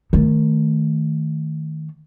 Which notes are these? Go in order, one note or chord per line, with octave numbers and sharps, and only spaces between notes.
D#3 A3